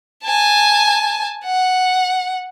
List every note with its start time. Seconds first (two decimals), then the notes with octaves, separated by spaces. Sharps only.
0.24 G#5 A5
1.45 F#5